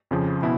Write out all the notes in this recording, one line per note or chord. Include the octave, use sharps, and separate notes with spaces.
F2 C#3 F3
B2 E4